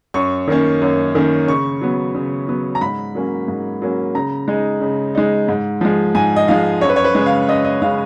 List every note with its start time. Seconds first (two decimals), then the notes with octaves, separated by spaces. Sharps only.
0.14 F#2 C#6
0.48 D#3 A#3 C#4
0.82 F#2
1.15 D#3 A#3 C#4
1.47 C#3 C#6
1.81 F#3 B3
2.15 C#3
2.48 F#3 B3
2.75 A#5
2.81 G#2 B5
3.15 F#3 A#3 C#4
3.48 G#2
3.82 F#3 A#3 C#4
4.15 C#3 A#5
4.48 G#3 D#4
4.81 C#3
5.15 G#3 D#4
5.48 G#2
5.81 F3 G#3
6.15 G#2 G#5
6.36 D#5
6.48 F3 G#3 F5
6.81 F#2 C#5
6.89 B4
6.96 C#5
7.04 B4
7.15 C#3 G#3
7.26 F5
7.48 F#2 D#5
7.64 D#5
7.82 C#3 G#3 F5